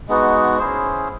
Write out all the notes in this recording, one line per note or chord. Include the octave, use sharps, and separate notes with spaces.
G#3 B3 D#4 F#4
C#4 E4 G#4 C5